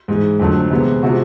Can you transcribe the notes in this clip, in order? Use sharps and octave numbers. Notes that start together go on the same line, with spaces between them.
G#2 E3 G#3
F2 D3 F#3 A3
C3 E3 G#3 B3
C3 F3 G#3 F#4